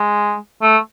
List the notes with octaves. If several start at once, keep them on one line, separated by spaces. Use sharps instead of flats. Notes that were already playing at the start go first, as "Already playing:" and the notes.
Already playing: G#3
A3